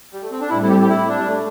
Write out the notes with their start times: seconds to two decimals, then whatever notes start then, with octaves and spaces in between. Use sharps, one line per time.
0.13 G3
0.22 A3
0.31 C4
0.41 D4
0.50 A2 G3 C4 E4 A4
0.62 E4
0.69 G4
0.81 G4
0.89 E4
1.08 D4
1.18 G3
1.27 A3